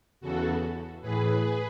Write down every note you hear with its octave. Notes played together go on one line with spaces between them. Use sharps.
E2 C#3 E3 F#4 A4
A2 E3 G#4 B4